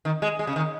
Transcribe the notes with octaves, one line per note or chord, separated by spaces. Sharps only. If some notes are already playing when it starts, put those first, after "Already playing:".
D#3
G#3
G#3
C#3
D#3